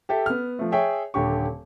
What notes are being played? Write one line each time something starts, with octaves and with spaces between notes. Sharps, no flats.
G4 A4 E5
B3 F6
F3 A3
G#4 C#5 E5 G5
D#1 D3 G4 C#6